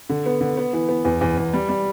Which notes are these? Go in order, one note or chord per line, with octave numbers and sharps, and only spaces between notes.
D3
B3
D3
B3
E3
B3
E2
E2
E2
G3
G3